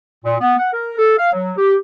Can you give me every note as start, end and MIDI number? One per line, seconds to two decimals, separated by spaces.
0.24 0.34 46
0.40 0.54 59
0.59 0.72 78
0.73 0.93 70
0.98 1.13 69
1.18 1.32 77
1.33 1.52 54
1.57 1.75 67